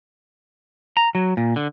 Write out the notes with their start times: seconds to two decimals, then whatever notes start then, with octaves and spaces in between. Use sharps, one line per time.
0.97 A#5
1.15 F#3
1.37 A#2
1.56 D3